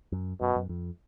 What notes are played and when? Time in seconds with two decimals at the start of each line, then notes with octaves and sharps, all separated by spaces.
0.12 F#2
0.40 F#2 B2
0.56 F#2
0.69 F2